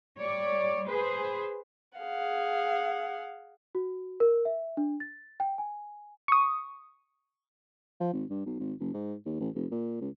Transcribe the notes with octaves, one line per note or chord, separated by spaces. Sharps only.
G3 C#5 D5
G#4 B4 C5
G#4 F5 F#5
F#4
A#4
E5
D4
A6
G5
G#5
C#6 D#6
F3
G#1
G2
B1
G#1
F#1
G#2
D#2
A1
F1
A#2
C#2